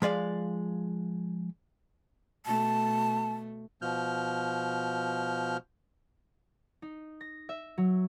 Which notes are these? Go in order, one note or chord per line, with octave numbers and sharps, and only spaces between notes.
F3 G#3 D5 F5
B2 A3 A5
B2 F3 F6 G6
D#4
A#6
E5
F#3